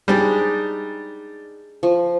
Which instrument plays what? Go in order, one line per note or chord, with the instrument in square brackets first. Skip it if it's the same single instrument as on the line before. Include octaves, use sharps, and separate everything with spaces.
[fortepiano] G3 [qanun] G#3 D4 D#4
[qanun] F3